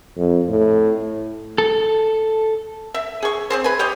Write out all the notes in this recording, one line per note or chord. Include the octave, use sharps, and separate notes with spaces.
F2
A2
A4
E5
G#4 C#6
C4 G#4 C5
B4 G#5
G4 C#5 D#5